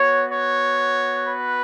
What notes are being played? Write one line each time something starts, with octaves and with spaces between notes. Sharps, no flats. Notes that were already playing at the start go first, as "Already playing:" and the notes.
Already playing: B3 F#4 C#5
C#5
B4